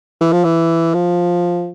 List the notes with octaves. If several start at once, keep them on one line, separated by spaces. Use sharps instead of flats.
E3
F3
E3
F3